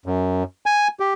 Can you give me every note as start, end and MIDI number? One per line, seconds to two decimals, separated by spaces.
0.06 0.43 42
0.66 0.88 80
1.00 1.14 67